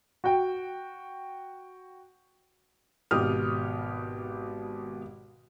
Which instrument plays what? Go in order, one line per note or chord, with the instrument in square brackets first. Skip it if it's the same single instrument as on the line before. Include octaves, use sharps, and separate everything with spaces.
[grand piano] F#4 G5
[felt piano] G#1 B2 G4 D#6 F6